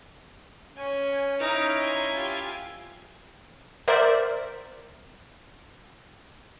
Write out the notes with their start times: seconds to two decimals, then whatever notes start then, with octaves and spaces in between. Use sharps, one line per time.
0.77 C#4 G#5
1.39 C#4 D#4 E4 F6 D7
1.81 G#5 A#5 C6
2.13 F4 G4
3.88 A#4 C5 D5 E5